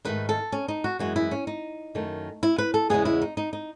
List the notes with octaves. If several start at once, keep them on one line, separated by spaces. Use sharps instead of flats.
G#2 D#3 A3 B4
A4
C#4
D#4
F#4
F#2 E3 G#3 B3 F#4
E4
C#4
D#4
F#2 D#3 A3
E4
B4
A4
E2 C#3 G#3 B3 G#4
E4
D#4
D#4
D#4